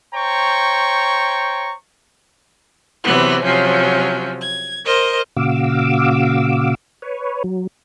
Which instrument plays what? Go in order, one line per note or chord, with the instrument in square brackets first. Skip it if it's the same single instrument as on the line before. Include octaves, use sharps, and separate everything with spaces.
[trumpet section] C5 C#5 G5 A#5 C#6
[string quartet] C3 E3 F#3 B3
C3 F3 F#3 C#4
G#6
A#4 C5 D#5
[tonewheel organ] A#2 C#3 F#4 F5 D6 E6
B4 C#5
F#3